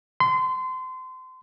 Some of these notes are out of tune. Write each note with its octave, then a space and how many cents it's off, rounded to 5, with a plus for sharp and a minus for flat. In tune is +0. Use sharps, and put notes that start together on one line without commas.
C6 -25